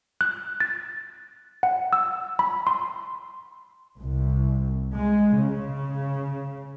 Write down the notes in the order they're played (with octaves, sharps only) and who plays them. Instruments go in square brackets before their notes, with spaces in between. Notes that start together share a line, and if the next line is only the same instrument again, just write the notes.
[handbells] F#6
A6
F#5
E6
B5
C6
[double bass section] C2
G#3
C#3